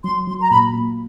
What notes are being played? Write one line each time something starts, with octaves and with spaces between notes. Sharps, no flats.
F#3 C6
F#3 C6
A#5
A#2 B5
A#2